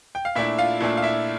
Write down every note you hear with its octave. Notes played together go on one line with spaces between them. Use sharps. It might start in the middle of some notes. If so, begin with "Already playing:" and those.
G5
F5
A#2 A3 D4 E4 E5
F4 F5
A#2 A3 D4
F5
E4 E5